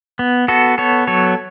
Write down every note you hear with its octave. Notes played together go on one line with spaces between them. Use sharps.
B3
B3 F#4 A4
B3 A4 C#5
F#3 A4 C#5